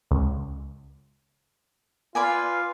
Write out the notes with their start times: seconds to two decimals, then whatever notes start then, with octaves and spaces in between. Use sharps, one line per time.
0.11 C#2
2.15 F4 B4 D5 G#5